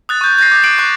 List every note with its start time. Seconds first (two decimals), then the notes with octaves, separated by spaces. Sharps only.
0.09 D#6 F#6 A6
0.21 C#6 G6
0.38 G6 A6 A#6 C7
0.51 D6 D#6
0.63 D6 F#6 C7 D7 F#7
0.79 C#6 F#6